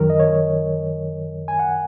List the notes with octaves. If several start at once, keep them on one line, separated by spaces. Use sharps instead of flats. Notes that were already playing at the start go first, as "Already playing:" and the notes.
Already playing: F#2 D#3 F#3 A#4
D#5
C#5
G#5
F#5